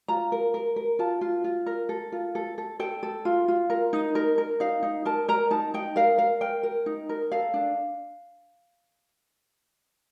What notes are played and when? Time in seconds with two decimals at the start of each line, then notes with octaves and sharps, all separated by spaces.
0.08 F4 A#5
0.32 A#4
0.54 A#4
0.76 A#4
0.99 F4 A5
1.21 F4
1.44 F4
1.66 A#4
1.89 A4
2.12 F4
2.35 A4
2.58 A4
2.80 A4 G5
3.03 A4
3.25 F4
3.48 F4
3.70 A#4
3.93 D#4
4.15 A#4
4.38 A#4
4.60 D#4 F5
4.83 D#4
5.05 A#4 A5
5.28 A#4 A#5
5.51 D#4 A5
5.74 D#4 G5
5.96 A#4 F5
6.18 A#4 F5
6.41 A#4 G5
6.63 A#4
6.86 D#4
7.09 A#4
7.32 A4 F5
7.54 D4